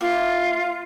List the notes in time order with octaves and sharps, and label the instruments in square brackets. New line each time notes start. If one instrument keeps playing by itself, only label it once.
[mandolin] A#3 E4 [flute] F4